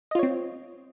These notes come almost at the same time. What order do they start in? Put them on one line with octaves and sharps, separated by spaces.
D#5 F4 C#5 C4